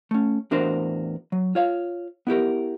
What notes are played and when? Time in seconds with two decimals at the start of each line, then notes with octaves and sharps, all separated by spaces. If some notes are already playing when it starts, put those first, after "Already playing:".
0.11 A3 C#4
0.51 E2 A2 D4 F#4 A#4 C5
1.32 F#3
1.55 F4 C#5 F5
2.27 B3 E4 G4 A#4